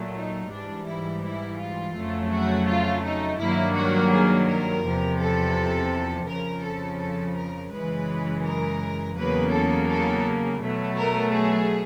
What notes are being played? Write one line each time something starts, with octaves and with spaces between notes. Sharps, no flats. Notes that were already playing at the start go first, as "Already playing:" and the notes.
Already playing: A#2 F#3 A3
D#4
G#2 E3 G3 D4
E4
E4
F4
F2 C#3 F#3 A3
F#4
F4
D#4
G2 D#3 F#3 A#3 E4
F#4
G#4
A#4
E2 C3 F3
A4
F2 C#3 F3 A#4
A4
A4
A#4
F#2 C#3 E3 G#3 B4
A#4
E2 C#3 F#3 A#3 B4
A4
A4
B2 F#3 A3
A#4
G#4